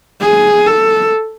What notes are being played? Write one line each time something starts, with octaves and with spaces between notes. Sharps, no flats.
G#4
A4